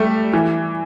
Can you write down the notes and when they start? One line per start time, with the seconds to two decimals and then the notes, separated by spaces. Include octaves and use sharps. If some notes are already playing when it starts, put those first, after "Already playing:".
Already playing: G3 A3
0.34 E3